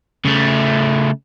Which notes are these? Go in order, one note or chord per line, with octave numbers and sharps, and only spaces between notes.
C#3 A3